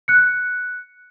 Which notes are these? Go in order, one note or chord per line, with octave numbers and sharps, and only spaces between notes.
F#6 C#7